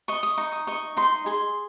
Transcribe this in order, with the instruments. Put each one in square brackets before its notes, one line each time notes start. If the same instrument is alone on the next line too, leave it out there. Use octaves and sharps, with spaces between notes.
[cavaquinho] D#5 C#6
D#6
D#4 C#6
D#6
D#5 C#6
D#4 C6
G#4 C6